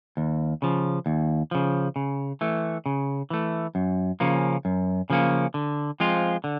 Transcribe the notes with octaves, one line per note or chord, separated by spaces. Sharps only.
D#2
C#3 F3
D#2
C#3 F3
C#3
E3 A3
C#3
E3 A3
F#2
C#3 F3 A#3 C#4
F#2
C#3 F3 A#3 C#4
D3
F3 G#3 C4 F4
D3